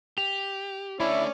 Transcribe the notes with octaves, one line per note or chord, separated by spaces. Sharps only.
G4 F7
A3 C#4 D4 E4 D5